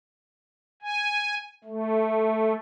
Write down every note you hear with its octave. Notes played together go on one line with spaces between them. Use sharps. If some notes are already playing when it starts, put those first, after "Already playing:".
G#5
A3